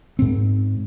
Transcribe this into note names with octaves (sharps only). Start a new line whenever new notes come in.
G#2 C4